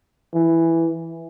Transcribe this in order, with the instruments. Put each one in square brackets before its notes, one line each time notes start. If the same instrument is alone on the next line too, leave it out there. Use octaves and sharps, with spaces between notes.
[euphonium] E3